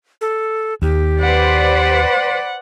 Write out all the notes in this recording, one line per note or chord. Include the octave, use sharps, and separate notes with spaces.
A4
D#2 G4
B4 C5 D5 F#5